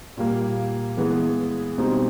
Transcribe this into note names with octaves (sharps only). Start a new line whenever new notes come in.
A#2 G3 A#3
E3 G#3 B3
B2 G3 C4 D#4